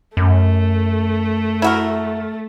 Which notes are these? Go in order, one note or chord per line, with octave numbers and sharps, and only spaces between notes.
F#2 A3
E4 F#4 A#4